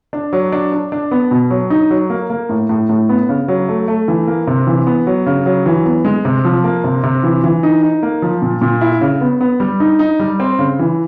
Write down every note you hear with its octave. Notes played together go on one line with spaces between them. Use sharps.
D4
F#3
D4
D4
D4
B3
B2
F#3
D#4
F#3
A#3
A#3
A2
A2
A2
B3
C#3
F#3
A3
A3
E3
A#3
C3
E3
B3
F#3
C#3
F#3
E3
B3
G#3
C3
F3
A#3
C3
C3
E3
E3
D#4
D#4
A#3
F3
A#2
A#2
E4
C#3
B3
B3
G3
D#4
D#4
G3
C4
C#3
E3